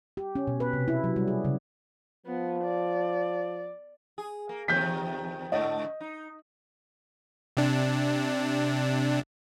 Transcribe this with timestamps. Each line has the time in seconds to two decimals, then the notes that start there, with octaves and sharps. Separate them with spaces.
0.17 G4
0.35 C#4
0.47 B2
0.60 B4
0.73 C3
0.88 E4
1.04 F#3
1.16 G3
1.28 G#4
1.45 C#3
2.26 F3 B3
2.64 D5
4.18 G#4
4.49 A#3
4.68 E2 C3 D#3 G6 B6
5.52 G#2 D3 A3 D#5
6.01 D#4
7.57 C3 D4